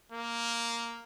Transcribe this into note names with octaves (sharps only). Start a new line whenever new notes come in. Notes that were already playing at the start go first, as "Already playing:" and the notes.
A#3